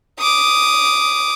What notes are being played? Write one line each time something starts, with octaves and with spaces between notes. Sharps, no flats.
D6 D#6